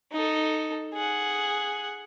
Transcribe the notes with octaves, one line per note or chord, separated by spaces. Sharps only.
D#4 A4
G#4 F#5